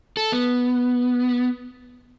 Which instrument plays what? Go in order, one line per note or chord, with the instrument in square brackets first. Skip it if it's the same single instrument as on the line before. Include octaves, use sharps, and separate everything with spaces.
[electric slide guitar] A4
B3